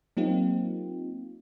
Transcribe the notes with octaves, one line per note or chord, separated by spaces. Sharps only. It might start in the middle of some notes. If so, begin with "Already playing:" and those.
F#3 A#3 C4 D#4 F4 G4